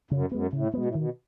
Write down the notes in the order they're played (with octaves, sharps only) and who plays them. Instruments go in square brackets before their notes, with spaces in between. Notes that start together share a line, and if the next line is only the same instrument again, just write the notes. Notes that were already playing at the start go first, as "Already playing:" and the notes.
[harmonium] F#2 [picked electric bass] C#3
[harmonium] F#2 [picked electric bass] G#3 B3
[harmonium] A2 [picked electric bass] C#3
[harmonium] B2 [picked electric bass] G#3 B3
[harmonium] A2
[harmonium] B2 [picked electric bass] D#3